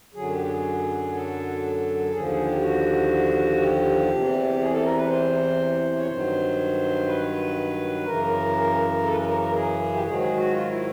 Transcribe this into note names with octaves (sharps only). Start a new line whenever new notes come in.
F#2 D3 F#3 G#4
G4
G#4
A4
D#2 D3 F3 G#4
G#4
G4
F#4
G4
E2 C3 E3
G#4
A4
A#4
B4
C5
C#5
G2 D#3 F#3 C5
B4
F#2 C#3 E3 A#4
A4
B4
A#4
A#4
A#4
G#4
G4
G#2 D#3 F#3 G#4
G#4
F#4
F4
E4